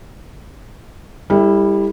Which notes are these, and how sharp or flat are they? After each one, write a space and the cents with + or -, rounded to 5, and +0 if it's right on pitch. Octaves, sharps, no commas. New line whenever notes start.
G3 +25 E4 -10 A4 +35